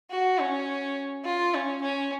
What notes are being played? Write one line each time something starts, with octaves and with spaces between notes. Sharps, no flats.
F#4
C#4
F4
C#4
C#4